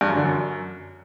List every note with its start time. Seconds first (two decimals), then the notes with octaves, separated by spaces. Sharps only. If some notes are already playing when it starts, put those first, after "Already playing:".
0.01 G2
0.09 F#2
0.16 D3
0.24 F#2